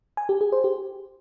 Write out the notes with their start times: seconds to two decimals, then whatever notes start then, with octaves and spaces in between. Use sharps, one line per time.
0.17 G#5
0.29 G4
0.41 G#4
0.52 C5
0.64 G4